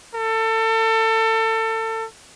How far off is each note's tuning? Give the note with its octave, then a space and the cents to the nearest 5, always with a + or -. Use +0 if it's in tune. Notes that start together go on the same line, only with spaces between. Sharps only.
A4 +30